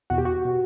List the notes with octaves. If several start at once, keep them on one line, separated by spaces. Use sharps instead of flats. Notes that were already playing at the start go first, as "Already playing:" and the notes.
E2 B2 F#4
G4
F#4
B2